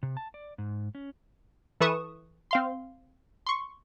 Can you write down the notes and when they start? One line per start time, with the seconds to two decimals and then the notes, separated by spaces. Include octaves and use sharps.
0.03 C3
0.17 A5
0.34 D5
0.58 G#2
0.95 C#4
1.81 E3 A4 B4 C#6 D#6 E7
2.51 C4 F5 C6
3.47 C6 C#6